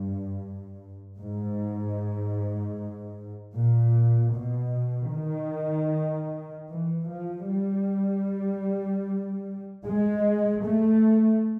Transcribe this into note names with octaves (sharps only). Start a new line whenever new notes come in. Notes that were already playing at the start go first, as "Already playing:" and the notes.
Already playing: G2
G#2
A#2
B2
D#3
E3
F3
G3
G#3
A3